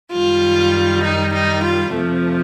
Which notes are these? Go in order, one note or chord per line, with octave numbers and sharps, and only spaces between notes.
F#2 D#3 G3 F4
D#4
D#4
F4
F2 C3 F3 A3